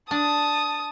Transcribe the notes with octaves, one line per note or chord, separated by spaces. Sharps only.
D4 A5 D#6